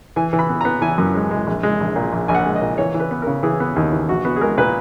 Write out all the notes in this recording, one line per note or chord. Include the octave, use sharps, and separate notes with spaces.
E3 G#5
E3
B5
B3
B3 A#5
E3 G#5
F#2
G#3
G#3
A#1
G#3
A#1
A#2
A#1
A#1 G#5
F#5
G#3
D#5
A#2
E3 C#5
E3
B4
B3
A#4
C#3
E3 G#4
B3
D#2
E3
A#1 F#4
B3 F#4
G#4
G#3 A#4
A#2 B4